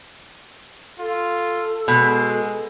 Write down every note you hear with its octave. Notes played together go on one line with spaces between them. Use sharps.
F4 A4
B2 G#3